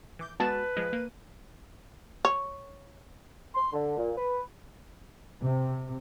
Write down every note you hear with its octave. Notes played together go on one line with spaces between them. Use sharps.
E3 D6 G6
G#3 B3 F#4 B4 A5
F3 G#3
A#3 D#7
C#5
C6
D3
A#2
B4
C3